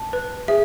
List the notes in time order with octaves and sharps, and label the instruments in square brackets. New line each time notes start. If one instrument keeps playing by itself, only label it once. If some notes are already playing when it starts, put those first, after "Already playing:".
Already playing: [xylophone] A5
B4
[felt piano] G#4 [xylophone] E5